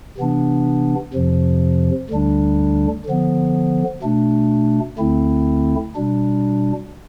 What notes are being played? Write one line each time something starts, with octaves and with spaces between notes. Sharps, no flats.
C3 E3 B3 D4
F2 C3 F3
D2 D3 G3 D4
D3 F3 B3
B2 A3 D4
D2 D3 A3 C4 E4
B2 G3 D4